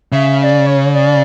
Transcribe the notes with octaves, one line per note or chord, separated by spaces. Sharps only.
C#3 E5
E5
D5
C#5
D5